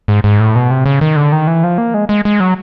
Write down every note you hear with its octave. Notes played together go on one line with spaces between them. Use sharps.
G#2
G#2
A2
B2
C3
C#3
D#3
D3
D#3
E3
F3
A#3
G#3
G#3
G#3
F#3